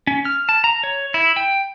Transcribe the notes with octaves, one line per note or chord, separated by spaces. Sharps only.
C#4
F6
A5
A#5
C#5
E4
G5